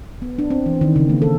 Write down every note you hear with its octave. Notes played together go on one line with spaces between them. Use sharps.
B3
D4
C4
E3
D#3
C#3
A#3
A4